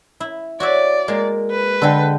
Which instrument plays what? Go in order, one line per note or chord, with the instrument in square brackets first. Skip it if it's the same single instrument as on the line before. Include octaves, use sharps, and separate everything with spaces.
[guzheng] E4
[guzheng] F#4 C#5 E5 [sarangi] D5
[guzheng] G#3 A#3
[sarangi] B4
[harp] D3 G5 [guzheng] G#3 A4